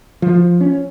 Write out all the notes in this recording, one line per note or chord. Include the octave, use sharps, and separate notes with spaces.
F3
C#4